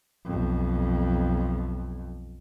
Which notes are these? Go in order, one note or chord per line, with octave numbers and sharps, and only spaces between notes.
B1 F2